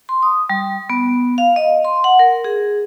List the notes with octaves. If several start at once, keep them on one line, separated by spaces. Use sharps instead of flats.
C6
D#6
G3
B3
F5
D#5
C6
F#5
A#4
G#4